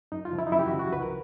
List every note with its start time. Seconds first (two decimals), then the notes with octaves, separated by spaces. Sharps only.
0.12 F#2 D#4
0.25 F4
0.32 C#3 F3
0.39 E4
0.47 D#4
0.52 F#2 E4
0.59 G4
0.66 F#4
0.72 C#3 F3
0.79 F#4
0.92 C2 B4
1.02 A#4